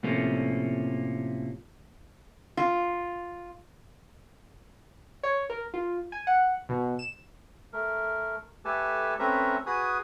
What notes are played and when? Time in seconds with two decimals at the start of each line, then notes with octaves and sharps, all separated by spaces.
0.03 A2 C3 F3 A3 A#3 C#4
2.57 F4
5.23 C#5
5.50 A#4
5.74 F4
6.12 G#5
6.27 F#5
6.69 B2
6.99 E7
7.73 A3 A#4
8.65 A3 G4 A4 B4 G#5 A5
9.19 A3 C4 C#4 B4 E5 A#5
9.66 F#4 G#4 B4 G#5 D#6